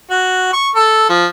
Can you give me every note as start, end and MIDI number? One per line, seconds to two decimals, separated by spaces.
0.10 0.48 66
0.53 0.69 85
0.75 1.09 69
1.09 1.26 53